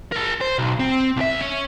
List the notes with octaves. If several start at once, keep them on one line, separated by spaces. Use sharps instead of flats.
A#4 A5
C5
B1
C4
C2 E5
C#4